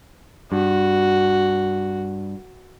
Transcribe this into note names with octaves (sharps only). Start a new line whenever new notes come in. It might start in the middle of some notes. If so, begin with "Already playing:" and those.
G2 F#4